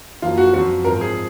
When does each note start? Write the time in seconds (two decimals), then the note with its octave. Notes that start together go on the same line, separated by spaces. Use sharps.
0.22 F#2 F3 A#3 F4
0.38 F#4
0.53 F#2 F3 C4 F#4
0.85 G#2 F3 C4 A#4
1.01 G#4